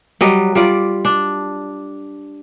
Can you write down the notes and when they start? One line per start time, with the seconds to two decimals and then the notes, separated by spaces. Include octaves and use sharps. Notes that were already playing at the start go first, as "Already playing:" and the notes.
0.21 F#3 G3 D#5
0.55 G3 F4 D5
1.05 D4